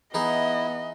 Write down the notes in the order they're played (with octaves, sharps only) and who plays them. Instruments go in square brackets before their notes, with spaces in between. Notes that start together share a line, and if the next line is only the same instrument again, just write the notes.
[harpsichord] E3 D#4 G#4 [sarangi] B3 [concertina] E4 [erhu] D#5